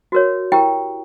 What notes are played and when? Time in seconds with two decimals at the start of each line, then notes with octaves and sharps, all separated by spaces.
0.12 F#4 A#4 C#5
0.52 E4 G4 A#4 G5